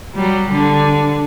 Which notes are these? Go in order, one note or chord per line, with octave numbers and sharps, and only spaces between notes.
F#3 G3
D3